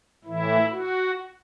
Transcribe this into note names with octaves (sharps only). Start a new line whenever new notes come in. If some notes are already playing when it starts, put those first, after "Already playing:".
A2 E3 E4
F#4